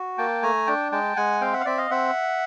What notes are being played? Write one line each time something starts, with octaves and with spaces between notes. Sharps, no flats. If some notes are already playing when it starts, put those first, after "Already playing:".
Already playing: F#4
A#3 G5 A5
A3 G#5 A#5
D4 G5 A5
G#3 G5 A5
G#3 F#5 G#5
C4 F5 G5
E5 F#5
F5
C4 D5 E5
D#5 F5
C4 E5 F#5